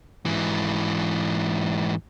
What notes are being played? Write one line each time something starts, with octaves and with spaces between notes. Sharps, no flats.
G#2 E3